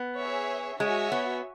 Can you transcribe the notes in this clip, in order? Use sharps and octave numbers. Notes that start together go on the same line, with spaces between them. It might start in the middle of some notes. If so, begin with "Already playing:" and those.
Already playing: B3
G#4 C#5 E5
G#3 F#4 C#5 E5 G#5
B3